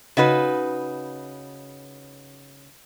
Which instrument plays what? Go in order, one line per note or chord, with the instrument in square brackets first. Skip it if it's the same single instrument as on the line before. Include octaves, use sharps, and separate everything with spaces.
[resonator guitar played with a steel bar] C#3 D#4 F#4 B4